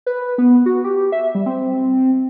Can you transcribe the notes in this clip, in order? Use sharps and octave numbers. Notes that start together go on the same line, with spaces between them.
B4
B3
F#4
G4
E5
G3
C4